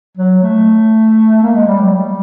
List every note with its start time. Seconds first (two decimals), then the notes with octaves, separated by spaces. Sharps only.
0.17 F#3
0.42 A3
1.43 A#3
1.55 G#3
1.67 G3
1.80 F#3
1.94 G3